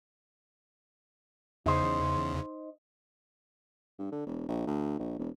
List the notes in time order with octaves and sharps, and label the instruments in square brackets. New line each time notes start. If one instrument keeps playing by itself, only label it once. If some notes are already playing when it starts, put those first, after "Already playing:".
[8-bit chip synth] E2 C#3 [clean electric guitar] D#4 C5
[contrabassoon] G2
D3
E1
A#1
D2
A#1
E1